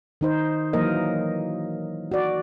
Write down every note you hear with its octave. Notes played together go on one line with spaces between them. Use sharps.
D#3 D#4 C5
E3 F#3 A#3 A#4 C5 D#5
F#4 D5